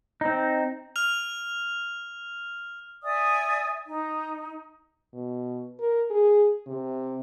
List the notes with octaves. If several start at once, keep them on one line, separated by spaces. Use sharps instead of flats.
C4 D#4
F6 F7
D5 E5 G#5 D#6
D#4
B2
A#4
G#4
C3